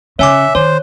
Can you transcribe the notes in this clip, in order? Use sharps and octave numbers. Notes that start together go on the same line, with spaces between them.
C#3 C#5 E5 G#5 D6
D#3 C5 C#5